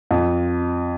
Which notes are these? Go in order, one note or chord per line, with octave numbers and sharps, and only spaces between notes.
F2